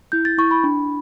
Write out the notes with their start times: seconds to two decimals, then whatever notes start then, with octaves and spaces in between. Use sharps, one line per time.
0.12 E4 G6
0.25 A6
0.38 E4 C#6
0.51 B5
0.64 D4